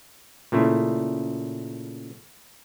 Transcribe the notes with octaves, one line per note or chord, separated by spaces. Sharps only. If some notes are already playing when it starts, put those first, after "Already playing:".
A#2 C#3 A3 E4